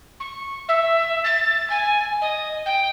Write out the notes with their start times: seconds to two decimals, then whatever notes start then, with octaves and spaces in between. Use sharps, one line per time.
0.20 C#6
0.68 E5
1.24 A6
1.70 G#5
2.21 D#5
2.65 G5